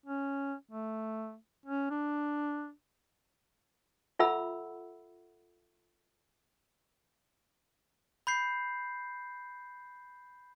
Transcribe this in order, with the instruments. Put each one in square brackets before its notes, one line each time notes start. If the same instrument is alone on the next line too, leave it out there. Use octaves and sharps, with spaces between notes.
[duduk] C#4
A3
C#4
D4
[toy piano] F4 A4 E5 F#5 B5 E6
[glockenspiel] B5 G6 C7